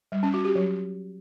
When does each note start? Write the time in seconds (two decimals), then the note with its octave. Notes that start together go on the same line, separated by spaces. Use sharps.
0.12 G3
0.23 C#4
0.34 F#4
0.45 G4
0.55 F#3